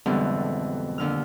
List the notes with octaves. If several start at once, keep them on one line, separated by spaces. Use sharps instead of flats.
F2 G#2 B2 D3 E3 G3
D#2 D3 F6